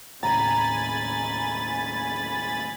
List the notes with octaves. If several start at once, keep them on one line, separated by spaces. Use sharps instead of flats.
D#2 A2 C#3 G#5 A#5 B5 A6